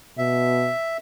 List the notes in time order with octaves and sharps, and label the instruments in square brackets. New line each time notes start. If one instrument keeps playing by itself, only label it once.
[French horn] B2 [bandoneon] E5